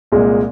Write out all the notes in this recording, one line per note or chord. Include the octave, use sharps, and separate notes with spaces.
C2 A#2 G#3